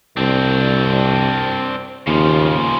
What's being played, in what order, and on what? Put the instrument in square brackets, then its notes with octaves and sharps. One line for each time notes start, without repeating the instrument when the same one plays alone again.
[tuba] C2 [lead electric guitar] C4 D4
[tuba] D#2 [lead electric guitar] C#3 F3